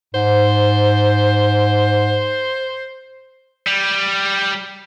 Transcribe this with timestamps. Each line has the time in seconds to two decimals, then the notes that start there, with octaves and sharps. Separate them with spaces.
0.14 G#2 C5
3.67 G3